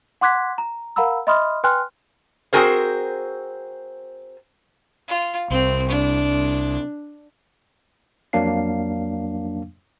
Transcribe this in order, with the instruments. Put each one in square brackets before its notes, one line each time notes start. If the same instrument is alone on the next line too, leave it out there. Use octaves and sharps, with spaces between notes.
[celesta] F#5 C6 D6 F#6 G#6 B6
A#5
A#4 F5 F#5 A#5 B5 E6
D#5 E5 B5 C6 D#6 F6
B4 G5 G#5 C6 F6 F#6
[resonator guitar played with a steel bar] C4 F#4 G#4 A#4 C5
[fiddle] F4
[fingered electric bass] C2 [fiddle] C4
[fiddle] D4
[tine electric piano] F2 F#3 A#3 D4 F5 C7